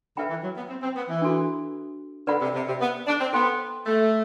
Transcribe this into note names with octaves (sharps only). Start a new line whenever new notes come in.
D3 B4 E5 G5 B5
E3
F#3
B3
C4
C4
B3
E3
D4 F#4 A4
D3 B4 D5 F#5 B5
C3
C3
C3
B3
D4
C4
B3 A4 C5 G5 C6
A3